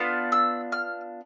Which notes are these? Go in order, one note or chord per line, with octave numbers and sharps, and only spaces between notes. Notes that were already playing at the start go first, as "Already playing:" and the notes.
Already playing: B3 D4 F4
E6
F6